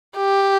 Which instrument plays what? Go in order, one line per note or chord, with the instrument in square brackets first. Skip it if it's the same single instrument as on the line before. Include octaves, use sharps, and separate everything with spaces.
[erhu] G4